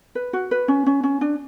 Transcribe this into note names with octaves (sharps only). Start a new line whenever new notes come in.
B4
F#4
B4
C#4
C#4
C#4
D4